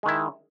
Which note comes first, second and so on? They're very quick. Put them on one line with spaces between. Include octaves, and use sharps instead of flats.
G#3 D#3 E4